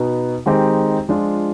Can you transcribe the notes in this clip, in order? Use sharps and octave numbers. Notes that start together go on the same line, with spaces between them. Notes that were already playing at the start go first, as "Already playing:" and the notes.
Already playing: B2 B3 D#4
D#3 G#3 C4 D#4 G4
F3 G#3 D4 F4